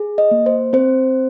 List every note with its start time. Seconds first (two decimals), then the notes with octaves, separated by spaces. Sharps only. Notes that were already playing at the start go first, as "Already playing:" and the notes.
Already playing: G#4
0.18 D#5
0.31 A#3
0.46 C5
0.73 C4 C5